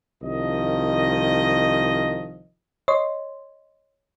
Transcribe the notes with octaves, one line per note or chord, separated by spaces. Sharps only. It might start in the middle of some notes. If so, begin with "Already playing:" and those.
C2 D#3 F3 D#5
C#5 D#5 C6